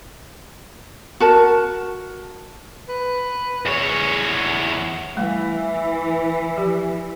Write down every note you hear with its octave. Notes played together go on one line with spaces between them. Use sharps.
F#4 A#4 A5
B4
E2 G#4 C#5
E3 G3 A3 F5
F3 G4